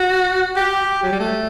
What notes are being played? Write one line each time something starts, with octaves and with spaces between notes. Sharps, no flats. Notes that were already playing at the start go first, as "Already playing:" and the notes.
Already playing: F#4
G4
F#3
G3
A3